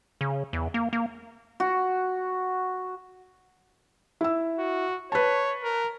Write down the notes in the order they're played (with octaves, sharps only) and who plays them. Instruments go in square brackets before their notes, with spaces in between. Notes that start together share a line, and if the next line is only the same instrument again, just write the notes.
[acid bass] C#3
E2
A#3
A#3
[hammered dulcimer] F#4
[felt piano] E4 E6
[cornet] F#4
[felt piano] B4 A5 [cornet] C#5
[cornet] A#4